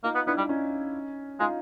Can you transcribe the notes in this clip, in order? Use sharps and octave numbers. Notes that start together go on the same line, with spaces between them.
A#3 D#4 F4
B3
B3 D4 E4
G3
C#4 D#4
G#3 D#4 F4